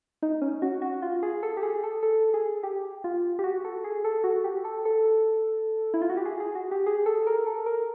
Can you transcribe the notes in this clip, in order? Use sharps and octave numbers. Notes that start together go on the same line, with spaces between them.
D#4
C#4
F#4
F#4
F4
G#4
A4
G4
G#4
A4
A4
G#4
G4
F4
G4
F#4
A4
G#4
A4
F#4
G4
A4
A4
E4
F4
F#4
G4
G#4
G#4
F#4
G4
G#4
A4
A#4
A4
A#4